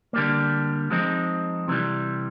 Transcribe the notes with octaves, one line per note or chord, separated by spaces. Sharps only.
D3 G3 A#3
F3 G#3 C4 D#4
C3 E3 G3